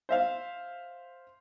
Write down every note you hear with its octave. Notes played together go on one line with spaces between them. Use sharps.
C5 E5 F5